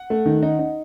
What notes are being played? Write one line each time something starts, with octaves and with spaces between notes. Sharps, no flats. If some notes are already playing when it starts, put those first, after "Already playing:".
Already playing: F#5
A3
D#3
D#4
D#4